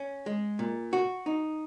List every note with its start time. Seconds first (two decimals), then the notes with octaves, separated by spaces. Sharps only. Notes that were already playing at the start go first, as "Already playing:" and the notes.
Already playing: C#4
0.26 G#3
0.59 A#2
0.93 F#4
1.26 D#4